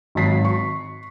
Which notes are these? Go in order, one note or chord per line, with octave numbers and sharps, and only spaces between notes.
G#1 F#3 B6 C7
C#6